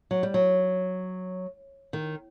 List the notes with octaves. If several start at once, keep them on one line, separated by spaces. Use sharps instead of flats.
F#3
G3
F#3
D#3